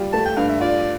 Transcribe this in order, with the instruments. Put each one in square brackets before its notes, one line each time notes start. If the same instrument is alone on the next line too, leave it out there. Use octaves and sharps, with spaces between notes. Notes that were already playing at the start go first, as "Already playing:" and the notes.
Already playing: [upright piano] G3 F4
[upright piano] A3 [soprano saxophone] A5
[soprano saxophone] G5
[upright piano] G2 [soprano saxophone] F5
[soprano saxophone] E5
[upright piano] F4 [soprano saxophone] D5